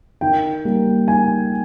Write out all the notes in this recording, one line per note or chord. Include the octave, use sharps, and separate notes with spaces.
D#3 G5
G3 A#3
D#3 G#5